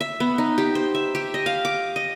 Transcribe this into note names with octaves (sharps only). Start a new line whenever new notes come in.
E5
B3
D#4
G4
C5
E5
G4
D#5
F5
D6
D#5